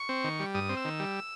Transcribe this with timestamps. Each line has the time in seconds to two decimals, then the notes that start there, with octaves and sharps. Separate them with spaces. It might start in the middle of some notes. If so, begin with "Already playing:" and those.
Already playing: C#6
0.09 C4
0.24 D#3
0.40 G3
0.54 G2 D#6
0.69 C4
0.77 E6
0.85 D#3
1.00 G3